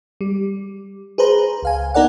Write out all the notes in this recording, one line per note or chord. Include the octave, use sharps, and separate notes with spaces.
G3
G#4 B4 C5 A#5
C#2 F5 G#5
B3 D#4 A#4 D5 F#5